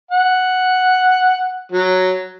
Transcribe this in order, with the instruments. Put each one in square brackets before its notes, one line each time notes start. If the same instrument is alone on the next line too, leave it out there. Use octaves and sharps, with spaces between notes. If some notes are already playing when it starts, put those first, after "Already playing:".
[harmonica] F#5
F#3